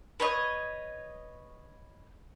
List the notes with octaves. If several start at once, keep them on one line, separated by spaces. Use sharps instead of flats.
B4 C#5 D#5